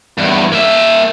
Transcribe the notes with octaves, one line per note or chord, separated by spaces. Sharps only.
E2 G2
A#3 E5